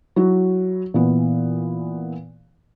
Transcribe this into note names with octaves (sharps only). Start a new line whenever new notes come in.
F#3 E4 F#4
A#2 E3 B3